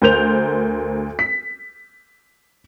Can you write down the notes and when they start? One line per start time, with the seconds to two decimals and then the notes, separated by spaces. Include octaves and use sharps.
0.02 D2 A#4 C5 G6 F7
1.19 B6